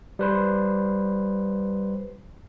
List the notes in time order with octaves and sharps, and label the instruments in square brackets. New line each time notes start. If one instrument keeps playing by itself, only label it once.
[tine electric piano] G3 B4 C5